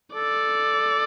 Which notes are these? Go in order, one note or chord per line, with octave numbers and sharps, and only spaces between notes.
A4 D5